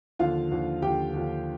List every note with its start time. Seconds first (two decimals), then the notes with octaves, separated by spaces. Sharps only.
0.19 D#2 D3 F3 F4 F5
0.51 D#2 D3 F3
0.82 D#2 D3 F3 G4 G5
1.13 D#2 D3 F3